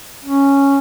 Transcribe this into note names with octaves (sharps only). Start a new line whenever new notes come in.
C#4